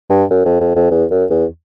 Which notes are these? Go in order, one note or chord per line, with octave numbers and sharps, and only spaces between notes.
G2
F#2
F2
F2
F2
E2
F#2
E2